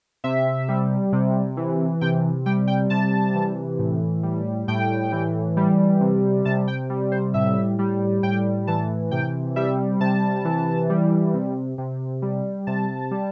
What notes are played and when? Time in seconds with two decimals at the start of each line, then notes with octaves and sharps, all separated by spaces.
0.24 C3 E5
0.68 G3
1.13 C3
1.57 E3
2.01 C3 G5
2.46 G3 G5
2.67 G5
2.90 C3 A5
3.35 E3
3.79 A2
4.23 G3
4.68 A2 G5
5.12 E3
5.57 G3
6.01 C3
6.45 C3 A5
6.68 G5
6.90 G3
7.12 C5
7.34 A2 E5
7.79 G3
8.23 A2 G5
8.67 E3 A5
9.11 C3 G5
9.56 G3 E5
10.00 C3 A5
10.45 E3
10.90 G3
11.34 C3
11.78 C3
12.22 G3
12.67 C3 A5
13.11 G3